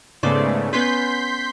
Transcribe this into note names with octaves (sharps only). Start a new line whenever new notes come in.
G#2 C#3 A3 B3 C5 D5
B3 C#4 B4 C6 G6 B6